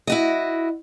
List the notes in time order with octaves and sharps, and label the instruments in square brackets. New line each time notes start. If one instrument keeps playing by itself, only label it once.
[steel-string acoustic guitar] E4 F#4 D#5